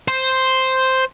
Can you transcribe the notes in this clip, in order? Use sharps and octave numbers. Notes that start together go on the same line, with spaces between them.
C5